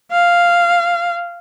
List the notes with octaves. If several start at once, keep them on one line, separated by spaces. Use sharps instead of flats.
F5